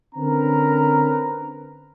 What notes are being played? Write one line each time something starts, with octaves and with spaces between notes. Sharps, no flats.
D3 C4 C#4 A#4 B4 A#5